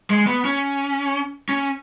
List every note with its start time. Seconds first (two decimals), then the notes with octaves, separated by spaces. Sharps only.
0.10 G#3
0.27 B3
0.45 C#4
1.49 C#4